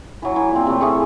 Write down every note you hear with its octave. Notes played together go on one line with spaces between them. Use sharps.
E3 F#3
E3
A#2 C4
C3 A3
E3 A3 G#4 C#6